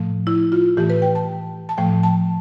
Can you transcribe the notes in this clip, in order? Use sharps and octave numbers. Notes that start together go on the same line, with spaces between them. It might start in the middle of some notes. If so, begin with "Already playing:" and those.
Already playing: A2 F3 A3
E4
F4
A2 E3 A3 G4
B4
G5
A5
A5
A2 F3 A3 G5
A5